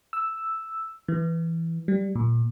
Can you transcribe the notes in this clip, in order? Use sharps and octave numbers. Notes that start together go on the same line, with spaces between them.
E6
E3
G3
A#2